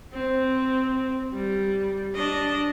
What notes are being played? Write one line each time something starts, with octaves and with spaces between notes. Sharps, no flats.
C4
G3
D4 D#5